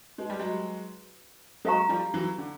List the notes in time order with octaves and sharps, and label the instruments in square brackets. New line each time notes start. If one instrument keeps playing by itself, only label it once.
[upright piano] G#3 [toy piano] D#4 F#4 B4
[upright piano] G3
F#3 G#3
[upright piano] F#3 G#3 [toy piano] A4 C5 F5 A#5 C#6
[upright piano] F3 G3
E3 F#3
D3